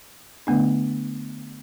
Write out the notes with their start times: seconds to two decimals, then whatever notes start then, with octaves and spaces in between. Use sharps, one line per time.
0.47 D3 A3 B3 D4